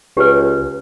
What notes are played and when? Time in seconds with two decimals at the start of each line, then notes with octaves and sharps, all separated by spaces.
0.17 C#2 G4 B4